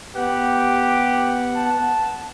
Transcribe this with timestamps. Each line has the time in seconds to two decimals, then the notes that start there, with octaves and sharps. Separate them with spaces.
0.16 B3 G4 F#5
1.55 A5